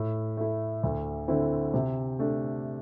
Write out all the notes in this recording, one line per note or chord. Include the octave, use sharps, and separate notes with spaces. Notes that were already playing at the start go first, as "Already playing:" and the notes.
Already playing: A2
A3 E4
D2
D3 C4 E4
C3
A3 D4